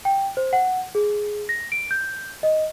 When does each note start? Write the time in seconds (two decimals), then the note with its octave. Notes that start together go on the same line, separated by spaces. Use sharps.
0.05 G5
0.37 C5
0.53 F#5
0.95 G#4
1.49 A#6
1.72 D7
1.91 G6
2.43 D#5